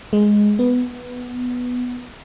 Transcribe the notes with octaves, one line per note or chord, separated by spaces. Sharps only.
G#3
B3